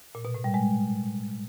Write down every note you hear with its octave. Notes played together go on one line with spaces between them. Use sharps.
A#2
B2
A2
G3
G#3